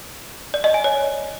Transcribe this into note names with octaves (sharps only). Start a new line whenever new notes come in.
D5
D#5
G#5
C#5